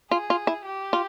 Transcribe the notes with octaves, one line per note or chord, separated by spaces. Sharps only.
F4 G#4
F4
E4
G4
F4